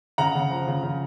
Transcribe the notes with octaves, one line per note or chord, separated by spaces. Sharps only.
C#3 F#5 A#5
C#3
F3
C#3
C#3